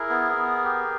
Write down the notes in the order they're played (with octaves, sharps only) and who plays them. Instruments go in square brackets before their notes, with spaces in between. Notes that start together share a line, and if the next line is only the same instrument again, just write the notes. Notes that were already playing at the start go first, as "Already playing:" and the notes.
Already playing: [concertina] E4 G#4 A#4
B3
B3
G4